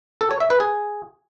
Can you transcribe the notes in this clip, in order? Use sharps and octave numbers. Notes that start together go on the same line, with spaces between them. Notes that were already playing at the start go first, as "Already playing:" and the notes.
A4
C#5
E5
B4
G#4